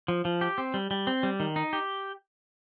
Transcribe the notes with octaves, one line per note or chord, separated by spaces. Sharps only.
F3
F3
G4
C4
G3
G3
C4
G3
D#3
D#4
G4